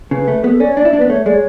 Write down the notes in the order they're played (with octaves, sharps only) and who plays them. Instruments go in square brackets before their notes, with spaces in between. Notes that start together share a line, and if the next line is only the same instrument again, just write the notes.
[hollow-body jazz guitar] C#3 [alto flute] B4
[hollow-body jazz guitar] A3
[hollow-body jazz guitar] B3 [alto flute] G#4
[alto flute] A4
[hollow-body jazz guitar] C#4 [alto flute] D5
[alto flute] C#5
[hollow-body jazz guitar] D4 [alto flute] D5
[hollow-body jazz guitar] E4
D4
[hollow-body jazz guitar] B3 [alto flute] B4
[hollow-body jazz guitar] A3 [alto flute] C#5
[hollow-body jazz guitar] G#3 [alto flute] D5
[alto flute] C#5